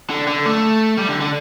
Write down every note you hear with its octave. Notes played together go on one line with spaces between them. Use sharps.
D3
D3
A3
G3
D3
D3